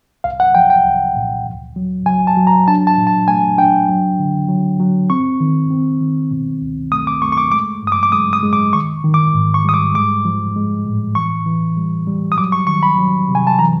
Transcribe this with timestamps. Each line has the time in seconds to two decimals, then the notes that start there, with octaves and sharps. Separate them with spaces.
0.24 C2 F5
0.40 F#5
0.55 F3 G5
0.70 G5
0.85 C2
1.16 A#2
1.45 D2
1.76 F#3
2.06 F#3 G#5
2.27 A5
2.37 F#3
2.47 A#5
2.68 D4 A5
2.87 A5
2.98 A#2
3.07 A5
3.28 A3 G#5
3.58 D4 G5
3.89 F#3
4.19 D3
4.48 F#3
4.80 F#3
5.10 C4 C#6
5.40 D#3
5.70 C4
6.01 D#3
6.31 B2
6.62 C#2
6.92 A3 D#6
7.07 D6
7.22 A3 C#6
7.32 C#6
7.38 D6
7.52 G#3 D6
7.83 G2 D#6
7.92 D6
8.03 D6
8.12 G#3 D#6
8.33 D#6
8.43 G#3
8.53 D6
8.73 D#3 C#6
9.04 D#3
9.14 D6
9.34 G#2
9.54 C#6
9.65 G3 D#6
9.74 D6
9.94 G#3 D6
10.25 F3
10.56 G#3
10.86 A2
11.15 E3 C#6
11.46 E3
11.77 G3
12.07 G3
12.32 D#6
12.37 F#3 D6
12.52 C#6
12.67 D#3 C#6
12.83 B5
12.98 F#3
13.29 C3
13.35 G#5
13.47 A5
13.59 E3 A#5